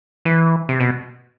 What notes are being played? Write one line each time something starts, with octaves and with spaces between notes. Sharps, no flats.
E3
C3
B2